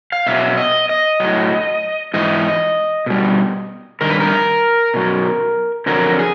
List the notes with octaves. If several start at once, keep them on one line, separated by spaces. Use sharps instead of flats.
F5
B2 F#3 E5
D#5
D#5
A2 F#3
G#2 E3 D#5
B2 G3
G2 D#3 A#4
B4
A#4
B2 F#3
F2 D3 F#3 A#4
G#4